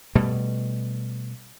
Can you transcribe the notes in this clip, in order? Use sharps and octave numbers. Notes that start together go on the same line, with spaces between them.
B2 G3 A3